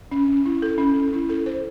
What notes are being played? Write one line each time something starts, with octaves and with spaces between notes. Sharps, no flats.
C#4
C#4
E4
A4
C#4
C#4
E4
A4
C5